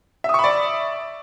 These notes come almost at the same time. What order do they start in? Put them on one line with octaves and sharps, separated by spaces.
E5 D#6 C#6 B5 D5